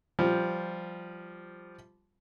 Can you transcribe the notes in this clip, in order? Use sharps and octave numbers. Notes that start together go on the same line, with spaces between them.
F3 G3